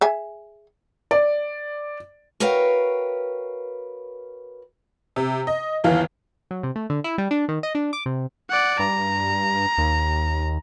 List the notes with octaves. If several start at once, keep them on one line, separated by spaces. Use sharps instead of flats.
G#4 E5 G#5
D5
F#4 A#4 B4 C#5 F5 G5
C3
D#5
G1 D#2 E3 F5
F#3
C3
A3
D3
E4
G3
D4
D#3
D#5
D4
D6
C3
D5 F#5
G2 A#5
D#2